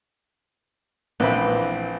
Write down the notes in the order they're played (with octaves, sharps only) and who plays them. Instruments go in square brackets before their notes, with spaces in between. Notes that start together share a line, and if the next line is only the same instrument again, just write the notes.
[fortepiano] A#1 C4 B5 [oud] E3